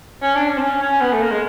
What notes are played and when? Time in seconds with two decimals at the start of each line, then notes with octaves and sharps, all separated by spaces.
0.22 C#4
0.36 D4
0.49 C#4
0.58 C4
0.61 C#4
0.82 C#4
1.01 B3
1.13 A3
1.21 A#3
1.31 G#3